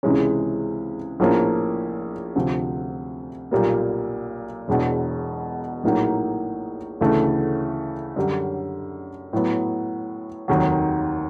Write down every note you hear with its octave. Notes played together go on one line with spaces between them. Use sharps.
C#2 C3 E3 G#3 C#4
A#1 A2 F3 A#3 C#4
D2 C3 F3
B1 A#2 G3 A#3
E1 E2 B2
A#1 A2 F#3 A#3 D#4
D2 C#3 E3 A3
F#2 D3 G3
A2 F#3 B3
F1 D#2 D#3 F#3